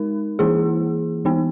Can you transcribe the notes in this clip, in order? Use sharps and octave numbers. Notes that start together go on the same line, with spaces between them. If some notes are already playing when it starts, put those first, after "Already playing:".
Already playing: G#3 D#4 A#4
E3 A#3 E4 G#4
E3 B3 D#4